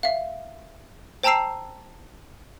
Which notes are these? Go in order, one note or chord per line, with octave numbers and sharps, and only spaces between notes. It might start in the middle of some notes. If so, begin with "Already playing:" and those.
E5 F5
C5 G5 A5 A#5 E6 C7